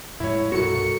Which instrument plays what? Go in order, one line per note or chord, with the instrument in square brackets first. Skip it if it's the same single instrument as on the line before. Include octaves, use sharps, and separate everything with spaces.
[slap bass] F2 A2 G#3 [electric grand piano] E4 C#5
[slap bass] C2 G2 B2 [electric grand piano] F#3 [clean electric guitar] F#4 A4 A#4 [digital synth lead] C#7